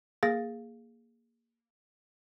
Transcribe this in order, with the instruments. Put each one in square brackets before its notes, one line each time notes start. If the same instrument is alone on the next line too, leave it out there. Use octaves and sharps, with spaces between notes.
[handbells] A#3 G#4 F5 A6 A#6